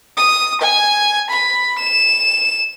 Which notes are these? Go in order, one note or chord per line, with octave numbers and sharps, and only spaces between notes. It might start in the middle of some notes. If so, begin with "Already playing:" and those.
D#6
G#5
B5
E7